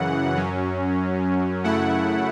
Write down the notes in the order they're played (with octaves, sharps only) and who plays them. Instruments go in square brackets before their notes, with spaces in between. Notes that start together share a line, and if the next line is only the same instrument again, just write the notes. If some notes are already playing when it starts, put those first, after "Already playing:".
Already playing: [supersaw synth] F#2 C#3 E3 F#5
F#2 F#3 C#4
F#2 C#3 A3 E4 F#5